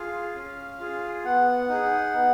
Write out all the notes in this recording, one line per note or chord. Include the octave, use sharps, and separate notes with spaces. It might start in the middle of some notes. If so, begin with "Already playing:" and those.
Already playing: F4 G#4 F5
C#4
F4 G#4
B3 F#5
D#4 G#4
B3